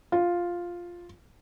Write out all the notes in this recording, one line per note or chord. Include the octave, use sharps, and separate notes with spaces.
F4